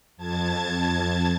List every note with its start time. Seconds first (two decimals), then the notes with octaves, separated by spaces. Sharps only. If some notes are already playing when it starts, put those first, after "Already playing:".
0.17 F2 A5 G#6 A6